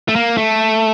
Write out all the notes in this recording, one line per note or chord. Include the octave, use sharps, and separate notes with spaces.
A3
A#3
A3